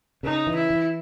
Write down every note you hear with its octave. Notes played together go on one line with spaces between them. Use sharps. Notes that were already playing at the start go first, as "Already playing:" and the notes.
C#3 D#4
E3
E4
E3